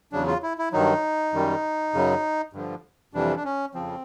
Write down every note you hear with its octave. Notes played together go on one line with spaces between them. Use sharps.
E2 C#3 F#3 D4
F4
E4
E4
G2 D#3 F#3 D#4
F#2 D#3 G3
F#2 C#3 F#3
G2 D3 F3
F2 C3 E3 G3 D4
D4
C#4
F2 C#3 F3 C4